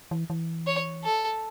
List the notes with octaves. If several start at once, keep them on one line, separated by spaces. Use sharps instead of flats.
E3
E3
C#5
A4